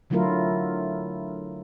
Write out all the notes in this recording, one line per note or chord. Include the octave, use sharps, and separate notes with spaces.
D3 F#3 A3 E4 F4 A#4